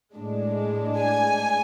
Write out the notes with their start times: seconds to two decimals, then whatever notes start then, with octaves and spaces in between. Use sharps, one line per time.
0.16 A2 G#3 D4
0.99 G#5